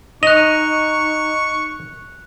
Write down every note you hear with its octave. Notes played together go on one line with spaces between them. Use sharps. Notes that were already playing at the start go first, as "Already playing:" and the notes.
D#4 D#5 C#6 F#6 F7